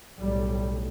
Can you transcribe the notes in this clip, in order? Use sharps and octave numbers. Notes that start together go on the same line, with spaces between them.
B1 A2 G3